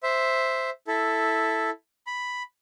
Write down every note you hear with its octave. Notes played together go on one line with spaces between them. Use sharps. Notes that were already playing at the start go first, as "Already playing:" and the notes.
C5 E5
E4 A4
B5